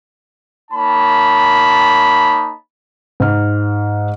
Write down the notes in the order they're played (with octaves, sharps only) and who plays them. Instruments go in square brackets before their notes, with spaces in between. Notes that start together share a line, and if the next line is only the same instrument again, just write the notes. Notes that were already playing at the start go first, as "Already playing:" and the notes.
[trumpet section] A#3 D#4 C#5 A5 B5
[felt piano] G#2 F6